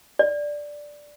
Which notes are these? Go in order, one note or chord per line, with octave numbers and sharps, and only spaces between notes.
D5